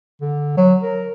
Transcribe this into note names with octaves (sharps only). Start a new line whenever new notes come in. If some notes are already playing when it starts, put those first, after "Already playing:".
D3
F#3
A#4